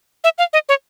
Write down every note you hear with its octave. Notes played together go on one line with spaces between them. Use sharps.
E5
F5
D#5
C#5